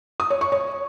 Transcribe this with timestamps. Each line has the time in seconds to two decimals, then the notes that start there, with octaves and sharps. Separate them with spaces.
0.20 D#6
0.30 C#5
0.41 C#6
0.52 C#5